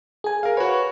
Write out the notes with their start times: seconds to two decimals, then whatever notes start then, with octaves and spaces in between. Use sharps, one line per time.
0.24 G#4 G#5
0.43 A#4 F5
0.57 F#4 B4 C#5